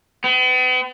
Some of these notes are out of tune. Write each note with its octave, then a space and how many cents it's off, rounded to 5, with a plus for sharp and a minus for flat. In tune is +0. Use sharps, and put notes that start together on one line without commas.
B3 +45